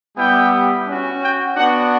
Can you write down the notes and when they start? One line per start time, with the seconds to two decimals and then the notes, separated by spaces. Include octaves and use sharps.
0.16 G3 B3 E4 G4 G5
0.86 C#4 F#4
1.21 G5
1.56 B3 D4 F#4 F#5